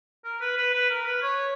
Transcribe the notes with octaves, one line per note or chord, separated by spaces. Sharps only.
A#4
B4
B4
B4
A#4
B4
C#5